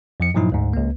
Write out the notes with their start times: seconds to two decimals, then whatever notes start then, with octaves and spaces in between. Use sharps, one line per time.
0.20 F2 F3 C#7
0.34 G2 A#2 F3 F#3 D#4 E4
0.52 D2 G#2
0.73 C#2 A#3